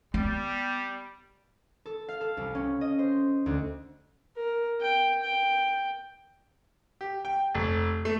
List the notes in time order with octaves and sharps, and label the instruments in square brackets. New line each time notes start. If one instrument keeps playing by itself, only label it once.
[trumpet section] G3 [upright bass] B3
[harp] A4
F5
A4
C2
C#4
D#5
C5
D2
[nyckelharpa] A#4
G5
G5
[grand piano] G4
G5
F1
A3